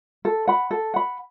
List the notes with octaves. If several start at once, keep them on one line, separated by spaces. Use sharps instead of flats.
A4
F#5 B5
A4
F#5 B5